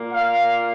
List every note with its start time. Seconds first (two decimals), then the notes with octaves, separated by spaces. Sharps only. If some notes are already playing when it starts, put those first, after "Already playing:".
Already playing: A#2 A#3
0.12 F5